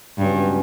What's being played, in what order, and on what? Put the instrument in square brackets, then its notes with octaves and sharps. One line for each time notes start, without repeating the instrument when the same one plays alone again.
[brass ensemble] C#2 B2 F#3 C#4 F#4 [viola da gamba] G2